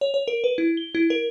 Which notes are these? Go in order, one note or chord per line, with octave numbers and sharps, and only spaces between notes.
C#5
C#5
A#4
B4
E4
G7
E4
A#4